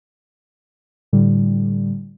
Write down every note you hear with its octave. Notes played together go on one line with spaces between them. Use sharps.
A2 D3 G3